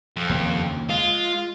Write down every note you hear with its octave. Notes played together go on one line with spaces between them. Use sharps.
F2
D#2 C#3 A#3
G#3 F4